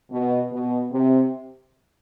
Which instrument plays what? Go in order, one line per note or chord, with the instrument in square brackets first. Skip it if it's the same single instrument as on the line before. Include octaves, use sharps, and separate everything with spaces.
[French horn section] B2
B2
C3